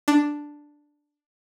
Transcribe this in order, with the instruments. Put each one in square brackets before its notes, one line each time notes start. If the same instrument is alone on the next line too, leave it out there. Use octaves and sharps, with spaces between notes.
[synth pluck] D4